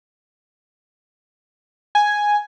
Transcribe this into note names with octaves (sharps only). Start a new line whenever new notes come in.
G#5